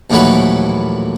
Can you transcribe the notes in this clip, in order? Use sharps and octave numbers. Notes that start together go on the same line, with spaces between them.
A#1 D#2 A2 E3 F#3 B4